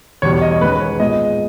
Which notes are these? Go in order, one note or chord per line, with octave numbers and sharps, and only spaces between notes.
E2 B2 G3 B3 C#5
C#5
D#5
C#5
G#2 D#3 G#3 C#4 B4
B4
C#5
A#2 G#3 B3 D#5